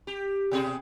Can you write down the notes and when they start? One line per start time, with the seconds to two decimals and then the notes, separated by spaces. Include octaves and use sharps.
0.07 G4
0.51 B2 G4 G#4